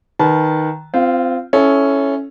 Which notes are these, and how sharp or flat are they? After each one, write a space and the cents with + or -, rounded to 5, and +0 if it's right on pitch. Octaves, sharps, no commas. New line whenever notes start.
D#3 +0 B4 +0 A5 -25
C4 -15 F4 -15 F5 +25
C#4 +0 E4 +0 A4 -20